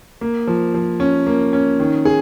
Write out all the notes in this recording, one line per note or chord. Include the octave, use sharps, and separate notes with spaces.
A#3
F3
F3
C#4
A#3
C#4
D#3
G#4